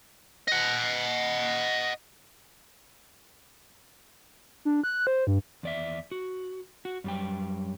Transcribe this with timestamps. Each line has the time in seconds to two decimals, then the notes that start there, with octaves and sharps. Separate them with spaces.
0.48 D#5 F#5
4.65 D4
4.84 F#6
5.07 C5
5.27 G2
5.63 E2 D5 E5
6.11 F#4
6.85 F#4
7.04 F#2 G3 G5